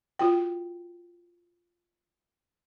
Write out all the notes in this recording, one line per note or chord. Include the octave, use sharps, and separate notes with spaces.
F4 F#4 G5